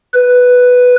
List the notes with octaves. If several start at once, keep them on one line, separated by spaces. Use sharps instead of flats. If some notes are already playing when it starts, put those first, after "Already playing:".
B4